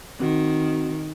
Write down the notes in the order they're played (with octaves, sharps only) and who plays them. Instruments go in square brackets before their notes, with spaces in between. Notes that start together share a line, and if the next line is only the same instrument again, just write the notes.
[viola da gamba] D#3 [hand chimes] C4 F#4